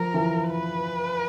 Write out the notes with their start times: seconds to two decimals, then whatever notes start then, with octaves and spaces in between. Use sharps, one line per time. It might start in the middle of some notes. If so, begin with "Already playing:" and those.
Already playing: F3 A#4
0.14 E3
0.50 B4